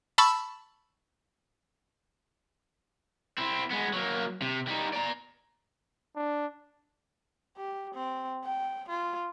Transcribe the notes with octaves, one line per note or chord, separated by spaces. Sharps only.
A5 B5 C#6 E6
C4 E4
G#3 B3
F#3 A#3
C3
G3 D#4
D5 A#5
D4
G4
C4
G5
F4